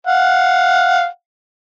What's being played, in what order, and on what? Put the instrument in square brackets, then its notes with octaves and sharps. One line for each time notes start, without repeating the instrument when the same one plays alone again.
[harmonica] F5 F#5